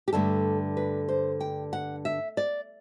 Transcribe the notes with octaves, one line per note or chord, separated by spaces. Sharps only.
G4
G2 D3 A3 A4
B4
C5
G5
F#5
E5
D5